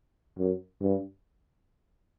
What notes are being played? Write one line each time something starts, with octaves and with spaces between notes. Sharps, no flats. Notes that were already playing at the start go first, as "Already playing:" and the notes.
F#2
G2